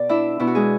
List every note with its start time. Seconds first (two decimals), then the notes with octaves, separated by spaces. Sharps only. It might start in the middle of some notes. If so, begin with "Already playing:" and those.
Already playing: B2 D5
0.09 D4 E4 E5
0.40 B2 E4
0.47 F#4
0.55 G#3 G#4